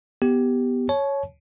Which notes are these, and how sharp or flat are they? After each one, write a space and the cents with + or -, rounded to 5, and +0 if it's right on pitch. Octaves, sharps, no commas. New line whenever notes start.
B3 +0 G4 +0
C#5 +0 A5 -40